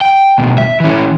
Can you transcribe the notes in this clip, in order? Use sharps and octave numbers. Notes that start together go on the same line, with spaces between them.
G5
D2 B2
E5
E3 C#4